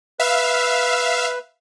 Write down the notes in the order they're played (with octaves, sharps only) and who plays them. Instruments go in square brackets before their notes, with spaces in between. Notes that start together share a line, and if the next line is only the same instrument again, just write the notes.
[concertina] B4 [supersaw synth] E5 F5